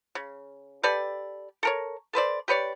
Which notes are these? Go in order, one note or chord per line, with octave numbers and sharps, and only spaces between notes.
C#3
G4 A4 B4 D5
A4 A#4 C#5
A4 B4 C5 D5
G4 B4 C#5 D5